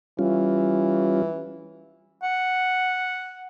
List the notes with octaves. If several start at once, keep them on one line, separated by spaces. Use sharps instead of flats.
E3 G3 C#4 F4
F#5